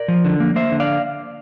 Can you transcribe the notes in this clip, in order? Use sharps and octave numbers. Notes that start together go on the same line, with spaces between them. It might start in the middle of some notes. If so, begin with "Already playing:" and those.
Already playing: A#4 D5
F3
D3
A#3
A#3 C5 E5
D3
D5 F5